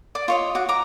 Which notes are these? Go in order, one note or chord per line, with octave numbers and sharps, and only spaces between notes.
D5 D6
F4 C#5 D#5
F#4 D6
A#5 D6